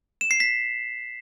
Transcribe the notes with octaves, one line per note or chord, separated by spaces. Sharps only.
E7
C7
B6